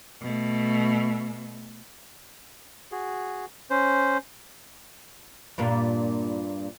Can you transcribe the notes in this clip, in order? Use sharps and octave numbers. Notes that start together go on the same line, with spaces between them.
B2 A3
F#4 G#4
C#4 C5
G2 A#2 A#3